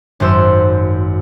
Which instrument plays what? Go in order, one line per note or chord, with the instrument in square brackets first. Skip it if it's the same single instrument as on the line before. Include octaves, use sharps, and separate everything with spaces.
[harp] G#1 F#2 C5 E6